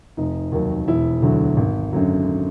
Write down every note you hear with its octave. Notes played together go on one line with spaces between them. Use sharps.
F1 D#4
D#2 D#3 F#3
E1 E4
D2 D3 F#3
G#1
F#2 D3 F#3